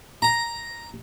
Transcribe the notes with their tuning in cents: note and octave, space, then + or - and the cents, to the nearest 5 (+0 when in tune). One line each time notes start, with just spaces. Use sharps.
A#5 +5